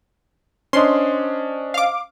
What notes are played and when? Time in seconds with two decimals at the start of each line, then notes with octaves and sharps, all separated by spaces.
0.73 C#4 D4 C5 D#5 C6 D#6
1.74 F5 D6